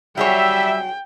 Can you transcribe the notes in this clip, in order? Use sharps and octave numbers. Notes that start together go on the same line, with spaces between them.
F#3 G3 G#4 C#5 E5 G5